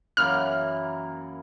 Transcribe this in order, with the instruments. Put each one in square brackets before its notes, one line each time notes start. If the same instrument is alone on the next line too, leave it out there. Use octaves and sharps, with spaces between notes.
[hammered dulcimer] F#2 E3 A#3 [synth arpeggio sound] F6